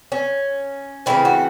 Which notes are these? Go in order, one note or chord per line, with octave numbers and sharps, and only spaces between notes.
C#4
C#3 E3 A3 C4 E4
F#4